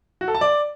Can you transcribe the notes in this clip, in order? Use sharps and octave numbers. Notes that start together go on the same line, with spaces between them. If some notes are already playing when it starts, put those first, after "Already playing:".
F#4
A4
A5
D5